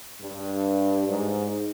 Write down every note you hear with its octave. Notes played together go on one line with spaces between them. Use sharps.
G2
G#2